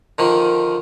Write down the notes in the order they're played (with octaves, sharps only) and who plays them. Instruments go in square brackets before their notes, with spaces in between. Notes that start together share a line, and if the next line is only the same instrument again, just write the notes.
[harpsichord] D3 D#3 F3